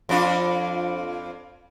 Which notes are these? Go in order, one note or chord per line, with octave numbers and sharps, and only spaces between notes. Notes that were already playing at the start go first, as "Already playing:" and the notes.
F2 D4 F4